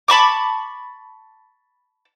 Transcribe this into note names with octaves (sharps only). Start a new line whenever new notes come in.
A5 B5 C#6 D6